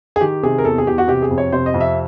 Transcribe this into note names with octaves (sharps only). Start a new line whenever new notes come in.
G#4
D#3 G4
C3 G#4
A#4
E2 A4
G#4
E2 G4
F#4
C3 G4
G#4
F2
C#5
C3 C5
D#5
F2
E5